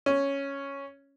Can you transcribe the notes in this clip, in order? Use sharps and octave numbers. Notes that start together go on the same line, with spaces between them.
C#4